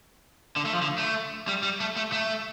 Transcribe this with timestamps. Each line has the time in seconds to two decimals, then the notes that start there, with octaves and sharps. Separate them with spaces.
0.56 D3
0.65 A3
0.73 F3
0.82 D3
0.98 A3
1.48 G3
1.63 G3
1.80 A3
1.96 A3
2.12 A3